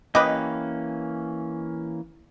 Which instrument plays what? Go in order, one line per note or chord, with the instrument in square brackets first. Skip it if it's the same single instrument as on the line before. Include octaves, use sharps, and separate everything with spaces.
[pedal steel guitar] E3 A#3 C#4 [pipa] G4 B4 [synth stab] D#5